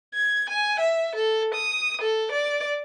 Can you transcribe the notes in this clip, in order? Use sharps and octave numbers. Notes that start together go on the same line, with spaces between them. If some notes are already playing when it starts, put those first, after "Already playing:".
G#6
G#5
E5
A4
D#6
A4
D5